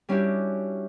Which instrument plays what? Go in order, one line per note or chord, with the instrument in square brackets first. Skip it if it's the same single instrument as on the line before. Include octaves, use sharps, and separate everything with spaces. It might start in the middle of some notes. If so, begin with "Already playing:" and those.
[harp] G3 C#4 D4 E4 F#4 G4